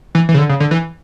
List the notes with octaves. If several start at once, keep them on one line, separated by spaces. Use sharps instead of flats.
E3
E3
C#3
D3
C#3
D3
E3